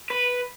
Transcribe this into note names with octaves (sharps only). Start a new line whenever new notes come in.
B4